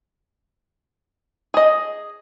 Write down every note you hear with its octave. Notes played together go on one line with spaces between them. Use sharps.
G#4 D#5